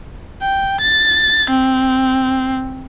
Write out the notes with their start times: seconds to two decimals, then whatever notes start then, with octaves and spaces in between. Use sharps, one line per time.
0.42 G5
0.81 A6
1.50 C4